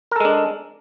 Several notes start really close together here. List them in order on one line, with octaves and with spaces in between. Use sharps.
A#4 A4 G#3 D4